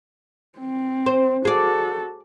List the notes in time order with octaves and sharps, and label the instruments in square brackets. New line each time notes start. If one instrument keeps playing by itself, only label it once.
[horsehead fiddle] C4
[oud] C5
[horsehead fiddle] F#4 A4 [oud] G#4 D5